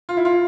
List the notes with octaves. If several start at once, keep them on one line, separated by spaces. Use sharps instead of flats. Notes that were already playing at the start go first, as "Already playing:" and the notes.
F4
E4
F4